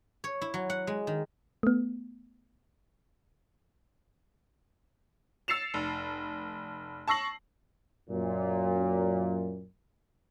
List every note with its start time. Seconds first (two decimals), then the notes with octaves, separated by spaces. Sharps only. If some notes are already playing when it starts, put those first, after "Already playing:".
0.24 C#5
0.42 E4
0.54 F#3
0.70 F#5
0.87 G#3
1.07 D#3
1.63 A3 B3
5.48 E6 A6 C7 C#7 E7 F7
5.74 F1
7.08 A5 C#6 E6 A#6 C7 F#7
8.10 F#2 A#2